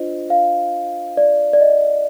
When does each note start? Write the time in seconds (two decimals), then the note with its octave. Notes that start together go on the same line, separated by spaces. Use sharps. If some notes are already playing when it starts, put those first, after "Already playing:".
Already playing: D4 F4 C5 D#5
0.30 F5
1.17 D5
1.53 D5
1.61 D#5